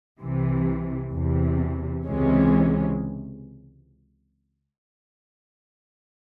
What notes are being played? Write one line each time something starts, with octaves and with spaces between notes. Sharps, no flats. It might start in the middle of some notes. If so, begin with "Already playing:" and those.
C2 C3 E3
E2 C3 E3
C#2 C3 E3 G#3 C#4